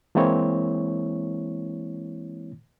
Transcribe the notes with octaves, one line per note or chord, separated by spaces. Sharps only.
E3 G#3 A#3 C4 E4 C#5